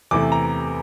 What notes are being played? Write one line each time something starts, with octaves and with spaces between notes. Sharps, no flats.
E2 C3 E3 A3 D6
A#5